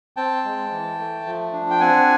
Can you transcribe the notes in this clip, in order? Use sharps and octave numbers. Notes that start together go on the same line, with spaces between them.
C4 G5 A5
G#3
E3
A3
F3
D4
G5
C4 F#5 G#5